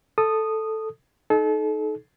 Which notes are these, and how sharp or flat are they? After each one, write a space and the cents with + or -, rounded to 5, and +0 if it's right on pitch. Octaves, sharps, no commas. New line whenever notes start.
A4 +0 D#6 -10
D#4 +0 A4 -35